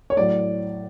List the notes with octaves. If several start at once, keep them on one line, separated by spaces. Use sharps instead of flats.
C#5
A2 F#3 D5